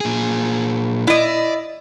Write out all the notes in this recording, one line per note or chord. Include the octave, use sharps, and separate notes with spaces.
A#2 G#4
E4 D5 D#5